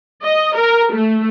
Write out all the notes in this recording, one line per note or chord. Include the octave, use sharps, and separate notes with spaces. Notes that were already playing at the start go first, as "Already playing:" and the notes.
D#5
A#4
A3